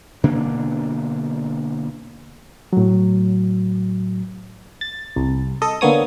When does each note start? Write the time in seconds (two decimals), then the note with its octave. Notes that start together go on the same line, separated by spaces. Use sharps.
0.23 B2 D3 A#3 D4
2.73 A2 F#3
4.81 A6
5.16 C2
5.62 A4 D#5
5.81 D3 A#3 B3 C#5 D#6